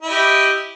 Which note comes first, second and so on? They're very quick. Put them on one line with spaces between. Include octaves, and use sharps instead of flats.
E4 D#5 G4